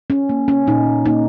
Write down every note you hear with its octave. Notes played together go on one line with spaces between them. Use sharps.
C#4
A#3
C#4
A#2 D#4
A#3 D#4